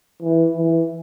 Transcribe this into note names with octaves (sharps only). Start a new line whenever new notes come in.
E3
E3